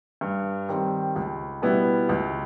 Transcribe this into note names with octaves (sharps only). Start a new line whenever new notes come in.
G2
D#3 G3 C4
C#2
B2 G3 B3 E4
C#2